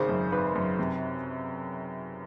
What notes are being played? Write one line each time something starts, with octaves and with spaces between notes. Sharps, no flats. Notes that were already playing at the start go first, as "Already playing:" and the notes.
Already playing: G#1 C#3 C5
F#2
G#1 B4
F#2
C3